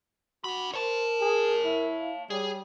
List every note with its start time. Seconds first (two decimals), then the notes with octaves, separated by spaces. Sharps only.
0.44 D4 F#4 B5
0.74 A#4 C5 C#5 A5
1.21 G#4
1.65 E4
2.00 F5
2.30 G3 G#4 C#5